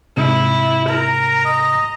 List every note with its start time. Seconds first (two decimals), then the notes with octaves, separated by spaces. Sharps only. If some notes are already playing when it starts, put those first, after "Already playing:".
0.17 G#2 C3 E4
0.89 A#4 A#5
1.45 D#5